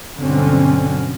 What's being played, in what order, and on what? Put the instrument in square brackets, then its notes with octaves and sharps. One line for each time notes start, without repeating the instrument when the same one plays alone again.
[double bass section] G2 B2 D3 F#3 C4 C#4